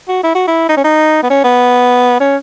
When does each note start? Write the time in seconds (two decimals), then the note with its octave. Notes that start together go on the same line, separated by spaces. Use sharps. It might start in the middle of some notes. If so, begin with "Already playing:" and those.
0.08 F#4
0.23 E4
0.35 F#4
0.48 E4
0.69 D#4
0.77 C#4
0.84 D#4
1.23 B3
1.30 C#4
1.44 B3
2.20 C#4